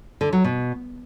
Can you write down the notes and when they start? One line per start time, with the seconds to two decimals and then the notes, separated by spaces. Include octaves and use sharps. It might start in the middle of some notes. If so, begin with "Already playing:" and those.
0.21 D3
0.33 F#3
0.44 B2